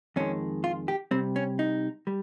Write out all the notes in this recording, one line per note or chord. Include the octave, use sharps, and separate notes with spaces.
F2 D#3 G#3 C#4
F4
G4
C3 G3 C4
C#4
D#4
G3